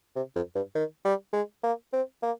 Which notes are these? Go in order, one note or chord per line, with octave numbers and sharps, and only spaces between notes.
C3
F2
G2
D#3
G3
G#3
A#3
C4
A#3